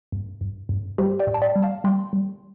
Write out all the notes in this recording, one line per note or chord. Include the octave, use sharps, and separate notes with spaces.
G2
G2
G2
G3 G4 C5
D5 G5
A2
A5
D5 G5
G3
F5 A5
G3 G5 C6
G3